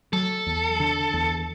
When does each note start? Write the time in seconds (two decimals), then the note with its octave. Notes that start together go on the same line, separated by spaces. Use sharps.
0.13 F#3 A4
0.46 E2
0.80 D3
1.13 E2